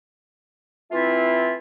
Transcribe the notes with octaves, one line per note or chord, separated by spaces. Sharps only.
E3 A3 C4 E4 F4